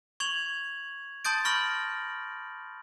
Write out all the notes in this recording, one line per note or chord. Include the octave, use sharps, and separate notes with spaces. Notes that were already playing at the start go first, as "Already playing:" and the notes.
C#6 G#6 F7 F#7
A5 C6 D#6 G6 A6 D7
B5 C#6 F6 A#6 F#7